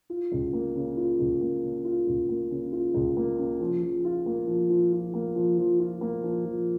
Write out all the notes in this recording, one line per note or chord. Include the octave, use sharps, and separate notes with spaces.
F4
C#2
A#3
C#3
F4
C#2
A#3
C#3
F4
C#2
A#3
C#3
F4
C#2
A#3
C#3
F3
F3
F4
A#3
F3
F3
F4
A#3
F3
F3
F4
A#3
F3
F3